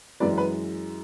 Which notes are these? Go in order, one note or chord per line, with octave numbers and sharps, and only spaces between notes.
F#2 E3 G#3 B4 D5
B4